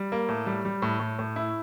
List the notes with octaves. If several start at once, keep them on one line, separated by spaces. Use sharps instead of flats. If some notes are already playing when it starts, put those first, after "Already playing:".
Already playing: G3
A#3
A2
G3
G3
A2
A2
A2
E4